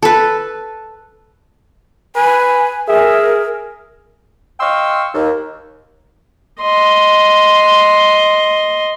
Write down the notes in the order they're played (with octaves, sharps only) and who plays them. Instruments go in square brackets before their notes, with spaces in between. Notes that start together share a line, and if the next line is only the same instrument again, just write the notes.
[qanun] A4 B4
[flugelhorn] B4 [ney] G#5
[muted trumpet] G#4 [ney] A#4 [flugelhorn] E5
[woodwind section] D#5 F5 G5 C6 C#6 E6
D#2
[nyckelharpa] D#5 C6